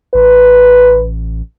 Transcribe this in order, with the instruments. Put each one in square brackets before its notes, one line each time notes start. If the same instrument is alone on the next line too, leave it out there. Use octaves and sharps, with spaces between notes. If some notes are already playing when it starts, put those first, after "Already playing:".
[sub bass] A1 [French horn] B4